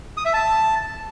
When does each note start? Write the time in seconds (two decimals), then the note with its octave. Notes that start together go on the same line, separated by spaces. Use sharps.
0.17 D#6
0.25 E5
0.33 A5